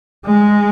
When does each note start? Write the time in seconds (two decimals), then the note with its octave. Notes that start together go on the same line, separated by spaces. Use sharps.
0.26 G#3